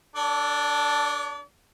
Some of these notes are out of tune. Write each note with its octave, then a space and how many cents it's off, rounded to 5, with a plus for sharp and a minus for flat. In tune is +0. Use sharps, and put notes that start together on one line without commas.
D4 +0 A4 +0 D5 -45